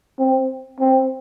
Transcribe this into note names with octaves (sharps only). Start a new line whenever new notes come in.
C4
C4